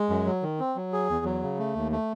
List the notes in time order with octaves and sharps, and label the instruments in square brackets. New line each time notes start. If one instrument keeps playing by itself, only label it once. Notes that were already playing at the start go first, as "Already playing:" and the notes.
Already playing: [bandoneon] G#3
F#2
F#3
D#3
C4
F#3
G#4
E2
F#3
C#3
A3
D#2
A3